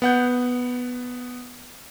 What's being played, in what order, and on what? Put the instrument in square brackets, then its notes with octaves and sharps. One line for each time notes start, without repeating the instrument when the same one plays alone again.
[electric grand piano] B3 F#5 G6